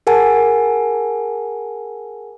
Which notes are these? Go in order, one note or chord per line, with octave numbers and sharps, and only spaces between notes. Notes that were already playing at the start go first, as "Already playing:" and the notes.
G#4 A#4 F#5 G#5 A5